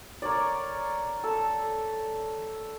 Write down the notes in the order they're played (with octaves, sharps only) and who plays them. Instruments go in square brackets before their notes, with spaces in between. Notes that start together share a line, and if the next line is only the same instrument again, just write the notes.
[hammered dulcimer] A#4 C#5 D5
A4